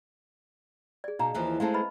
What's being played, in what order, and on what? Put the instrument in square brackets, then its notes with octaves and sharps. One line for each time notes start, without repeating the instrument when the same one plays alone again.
[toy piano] G#4 D5
[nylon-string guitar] B2 [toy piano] D#4 F5 A#5
[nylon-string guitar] D#2 E3 F3
[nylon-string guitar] G#3 A3 C4 [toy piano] F5 A5
[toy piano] B4 D#5 B5